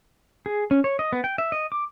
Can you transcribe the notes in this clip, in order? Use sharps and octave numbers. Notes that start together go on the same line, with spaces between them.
G#4
C#4
C#5
D#5
B3
G5
E5
D#5
D6